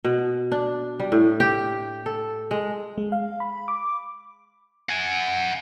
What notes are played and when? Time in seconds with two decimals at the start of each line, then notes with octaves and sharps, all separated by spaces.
0.04 B2
0.52 D4
1.00 G3
1.12 A2
1.40 G4
2.06 A4
2.51 G#3
2.98 G#3
3.12 F5
3.40 B5
3.68 D6
4.89 F#5 G#5